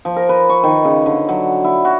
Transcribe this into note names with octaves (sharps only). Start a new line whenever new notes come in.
F3
A#4
B4
C#6
D#3
C#3
D3
F#3
E4
F#4